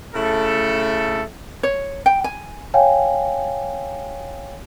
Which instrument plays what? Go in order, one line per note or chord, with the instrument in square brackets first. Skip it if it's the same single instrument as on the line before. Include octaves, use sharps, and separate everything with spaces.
[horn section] C#3 A3 E4 A4
[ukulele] C#5
G5
G#5
[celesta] C#5 F5 G5 G#5